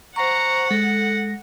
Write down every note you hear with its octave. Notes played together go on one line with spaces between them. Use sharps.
C5 F#5 A#5 C#6
G#3 A4 A#6